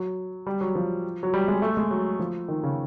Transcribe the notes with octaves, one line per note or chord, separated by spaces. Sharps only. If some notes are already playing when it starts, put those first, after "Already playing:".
Already playing: F#3
G3
F#3
F3
F#3
G3
G#3
A3
G#3
F#3
F3
D#3
C#3